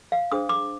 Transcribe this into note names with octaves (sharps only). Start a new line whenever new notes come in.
F5
D4 G#4 C5 D#6
D6